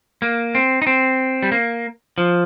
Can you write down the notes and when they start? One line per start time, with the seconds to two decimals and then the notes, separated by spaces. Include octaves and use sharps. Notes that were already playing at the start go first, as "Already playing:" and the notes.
0.22 A#3
0.55 C4
0.82 D#4
0.87 C4
1.43 G3
1.52 A#3
2.18 F3